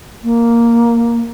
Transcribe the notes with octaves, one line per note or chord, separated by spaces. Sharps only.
A#3